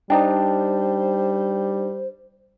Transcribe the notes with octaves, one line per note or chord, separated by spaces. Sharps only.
G3 D4 D#4 C5 G5 A5